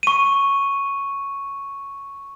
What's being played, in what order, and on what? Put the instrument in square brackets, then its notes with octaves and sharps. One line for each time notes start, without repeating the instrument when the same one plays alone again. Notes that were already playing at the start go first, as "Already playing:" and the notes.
[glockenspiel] C#6 D#7